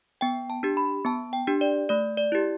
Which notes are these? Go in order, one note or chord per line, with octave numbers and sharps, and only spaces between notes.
B3 G5
A5
D4 G4
B5
B3 A5
G5
D4 G4
D5
A3 D5
D5
E4 G4